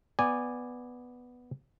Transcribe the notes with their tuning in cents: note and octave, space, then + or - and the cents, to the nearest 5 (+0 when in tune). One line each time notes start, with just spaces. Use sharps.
B3 +0 D5 +0 G#5 -15